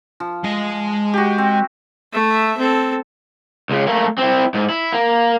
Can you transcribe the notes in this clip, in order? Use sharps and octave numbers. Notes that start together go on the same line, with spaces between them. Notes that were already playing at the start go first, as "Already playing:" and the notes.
F3
G#3 D#5
F#4 G4
C4
A3 E5
C4 A4
C#2 C#3
A3 A#3
C4 E4
G#2
E4
A#3